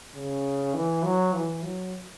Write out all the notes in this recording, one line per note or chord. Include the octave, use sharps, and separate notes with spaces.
C#3
E3
F#3
E3
F#3